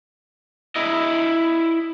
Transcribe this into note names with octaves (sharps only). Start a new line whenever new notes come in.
E4 D#5